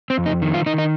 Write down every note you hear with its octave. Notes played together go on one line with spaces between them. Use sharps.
C4
F2
D#4
D#3
F4
D#3 D#4
D#4